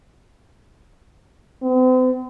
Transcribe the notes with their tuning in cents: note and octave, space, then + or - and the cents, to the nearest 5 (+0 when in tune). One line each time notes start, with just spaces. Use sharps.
C4 -45